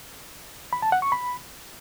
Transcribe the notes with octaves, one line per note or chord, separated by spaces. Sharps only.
B5
A5
F#5
C#6
B5